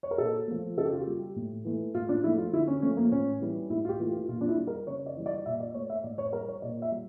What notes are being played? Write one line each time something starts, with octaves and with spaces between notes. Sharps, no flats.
C#5
A#4
A#2 A4
F3 A3
C#3 A4
G4
F4
G4
G3
A2
E3 A3
A2 F4
D4
F3 A3 E4
F4
D3 E4
C#4
F3 A3 C#4
A#3
A2 C#4
E3 G3
A2 E4
F4
G4
E3 A3
F4
A#2 F4
D4
E4
G3
A#4
C#3 C#5
D5
E3 G3
D5
A#2 E5
D5
A3 C#5
E5
A2 D5
C#5
G3 A#4
C#5
A#2 D5
E5
G3